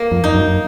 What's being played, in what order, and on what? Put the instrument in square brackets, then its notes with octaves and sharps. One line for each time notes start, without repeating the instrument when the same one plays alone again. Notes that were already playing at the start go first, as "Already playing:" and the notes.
Already playing: [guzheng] A#3
[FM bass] F2
[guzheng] D#4
[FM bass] F#2